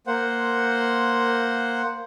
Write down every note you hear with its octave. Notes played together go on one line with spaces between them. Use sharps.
A#3 C5 F#5